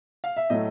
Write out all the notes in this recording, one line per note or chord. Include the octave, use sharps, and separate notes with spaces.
F5
E5
A2 F#3 A3 D#5